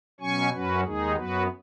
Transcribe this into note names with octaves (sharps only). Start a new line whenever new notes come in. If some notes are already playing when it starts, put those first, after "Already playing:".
B2 F#3 C#4 G#5 C#6
F#2 F#3 C#4 F#4 B4
D#2 D#3 G#3 D#4 G#4
F#2 F#3 B3 F#4 B4